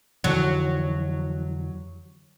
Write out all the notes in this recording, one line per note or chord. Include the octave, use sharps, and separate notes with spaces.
F2 D3 E3 F#3